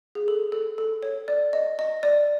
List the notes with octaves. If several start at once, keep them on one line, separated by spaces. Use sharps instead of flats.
G#4
A4
A4
A4
C#5
D5
D#5
D#5
D5